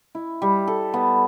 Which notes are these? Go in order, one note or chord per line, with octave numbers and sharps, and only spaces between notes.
E4
G3
A4
B3